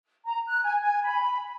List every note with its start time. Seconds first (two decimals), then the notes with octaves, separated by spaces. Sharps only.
0.25 A#5
0.47 F#6
0.64 G#5
0.82 G#5
1.04 B5